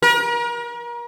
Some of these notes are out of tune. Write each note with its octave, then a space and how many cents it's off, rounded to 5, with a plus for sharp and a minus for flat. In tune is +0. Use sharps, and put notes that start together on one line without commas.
A#4 +35